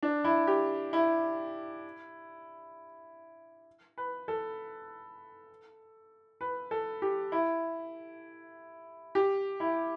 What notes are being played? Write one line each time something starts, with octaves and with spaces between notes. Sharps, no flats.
D4
E4
G4
E4
B4
A4
B4
A4
G4
E4
G4
E4